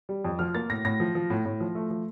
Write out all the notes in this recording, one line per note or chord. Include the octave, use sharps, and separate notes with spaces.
G3
F2
F3 F6
A#3 A6
A2 A#6
A2 A#6
F3
F3
A2
A2
F3
A3
F3